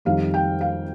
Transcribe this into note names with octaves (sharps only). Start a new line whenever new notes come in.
F2 D#3 G3 F5
G5
F5